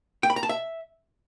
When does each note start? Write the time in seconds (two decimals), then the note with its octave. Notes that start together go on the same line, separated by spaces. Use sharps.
0.23 G5
0.30 B5
0.36 A#5
0.43 A5
0.49 E5